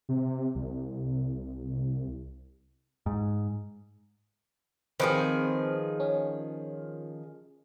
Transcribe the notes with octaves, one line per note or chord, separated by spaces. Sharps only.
C3
C2
G#2
D#3 F3 C4 G#4 B4 C5
C#4